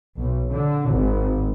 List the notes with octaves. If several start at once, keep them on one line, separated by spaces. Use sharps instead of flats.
B1
D3
G#1